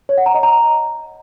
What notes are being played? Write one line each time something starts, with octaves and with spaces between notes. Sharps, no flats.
C#5
F#5
A#5
D#5
A#5